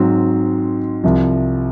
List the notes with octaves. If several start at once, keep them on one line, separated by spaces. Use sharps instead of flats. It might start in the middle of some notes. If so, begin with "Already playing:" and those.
Already playing: G#2 F#3 C4
C2 C3 F3